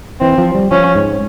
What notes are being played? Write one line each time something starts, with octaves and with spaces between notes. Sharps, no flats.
E3 C4
F3
G3
F3 C#4
G#2